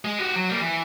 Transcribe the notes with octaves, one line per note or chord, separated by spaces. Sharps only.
G#3
F#4 G4
F#3
G3 A#3
E3